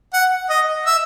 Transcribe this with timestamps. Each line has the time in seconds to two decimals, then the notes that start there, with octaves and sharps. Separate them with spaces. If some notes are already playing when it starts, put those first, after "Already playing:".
0.13 F#5
0.49 D#5
0.86 E5